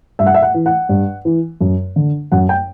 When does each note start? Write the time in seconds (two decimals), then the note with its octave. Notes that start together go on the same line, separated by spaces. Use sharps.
0.19 G2 E5
0.26 F#5
0.34 E5
0.42 F#5
0.54 E3
0.66 F#5
0.89 G2
1.25 E3
1.61 F#2
1.96 D3
2.32 F#2 F#5
2.49 G5